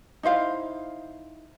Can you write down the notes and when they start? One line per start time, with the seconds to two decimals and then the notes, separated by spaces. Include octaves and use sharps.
0.23 D#4 E4 C5 F5